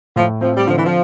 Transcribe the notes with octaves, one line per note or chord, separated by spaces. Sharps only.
A2 F3
F3 C4
G3
D3 F3
E3
F3